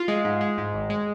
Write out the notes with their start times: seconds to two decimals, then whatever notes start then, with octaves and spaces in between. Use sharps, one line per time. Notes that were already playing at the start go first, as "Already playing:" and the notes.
Already playing: F4
0.08 G#3
0.25 G#2
0.41 G#3
0.58 G#2
0.74 G#1
0.90 G#3